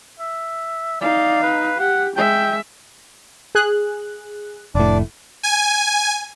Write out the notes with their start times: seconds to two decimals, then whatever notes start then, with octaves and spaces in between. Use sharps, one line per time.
0.20 E5
1.01 D#4 D5 F5
1.43 B4
1.79 G4 F#5
2.16 G#3 E5 G5
3.55 G#4 F#6
4.75 F1 A2 D4 D5
5.43 G#5